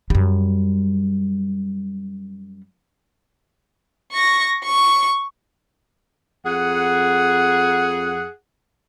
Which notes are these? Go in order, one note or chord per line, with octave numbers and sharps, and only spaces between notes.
F#2 G3
C#6 A#6
C#6
F2 G#4 F#5